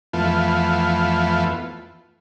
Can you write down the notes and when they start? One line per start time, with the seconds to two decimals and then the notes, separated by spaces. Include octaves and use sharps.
0.13 F2 E3 A3 B3 F4